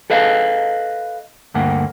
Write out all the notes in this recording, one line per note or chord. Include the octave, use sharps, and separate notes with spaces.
A4 B4 D#5 F5
D2 G2 A#3 F#5